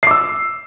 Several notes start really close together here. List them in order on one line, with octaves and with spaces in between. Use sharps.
C7 D6 E6